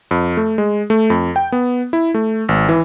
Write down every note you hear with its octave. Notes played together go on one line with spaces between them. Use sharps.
F2
A3
G#3
A3
F2
G5
B3
E4
A3
G#1
E3